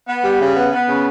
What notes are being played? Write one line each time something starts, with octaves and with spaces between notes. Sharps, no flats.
B3
G3
C#3
B3
B3
C#3